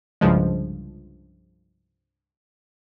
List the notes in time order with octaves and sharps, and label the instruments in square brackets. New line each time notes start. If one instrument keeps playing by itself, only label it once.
[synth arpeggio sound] C2 G2 C#3 F3 G#3